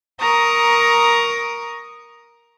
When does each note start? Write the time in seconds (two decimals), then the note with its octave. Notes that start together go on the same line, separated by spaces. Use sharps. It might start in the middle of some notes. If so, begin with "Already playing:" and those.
0.20 A#4 A#5 C#6 D#6